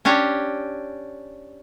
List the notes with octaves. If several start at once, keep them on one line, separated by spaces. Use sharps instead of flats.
C#4 D4 G4 C#5